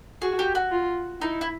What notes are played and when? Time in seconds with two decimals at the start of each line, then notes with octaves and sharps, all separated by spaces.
0.22 F#4 G#4
0.39 G4
0.55 F#4
0.71 F4
1.21 D#4 E4
1.41 E4